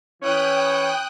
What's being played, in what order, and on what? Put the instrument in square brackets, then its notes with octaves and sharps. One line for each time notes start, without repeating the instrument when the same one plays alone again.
[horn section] E3 C#4 E4 [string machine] G5 D#6 F#6